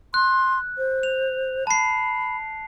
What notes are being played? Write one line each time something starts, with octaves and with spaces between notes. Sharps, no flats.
C6 F#6
C5
F7
A5 B5 C7